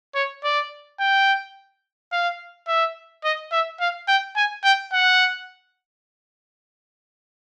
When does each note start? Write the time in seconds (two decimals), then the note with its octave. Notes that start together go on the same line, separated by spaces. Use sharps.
0.15 C#5
0.44 D5
1.00 G5
2.12 F5
2.68 E5
3.24 D#5
3.52 E5
3.80 F5
4.08 G5
4.36 G#5
4.64 G5
4.93 F#5